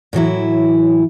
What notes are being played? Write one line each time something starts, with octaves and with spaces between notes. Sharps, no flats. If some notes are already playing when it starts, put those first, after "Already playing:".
A2 E3 F#3 E4